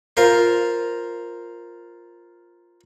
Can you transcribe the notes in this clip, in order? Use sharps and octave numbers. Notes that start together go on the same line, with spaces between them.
F4 A#4 C5